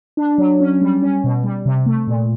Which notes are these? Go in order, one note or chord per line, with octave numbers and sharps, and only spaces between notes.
D4
F#3
C#4
G3
C#4
B2
G3
C3
A3
A#2